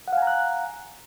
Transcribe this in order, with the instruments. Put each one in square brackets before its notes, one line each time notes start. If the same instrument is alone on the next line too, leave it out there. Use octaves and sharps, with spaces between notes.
[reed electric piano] F#5
F5
G#5
A#5
F#6